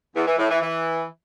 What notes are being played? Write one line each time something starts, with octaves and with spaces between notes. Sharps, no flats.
E2
E3
A2
E3
E3